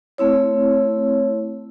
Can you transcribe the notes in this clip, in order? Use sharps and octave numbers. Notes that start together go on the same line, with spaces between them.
A3 C4 E4 C#5